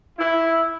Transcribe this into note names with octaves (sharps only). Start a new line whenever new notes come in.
E4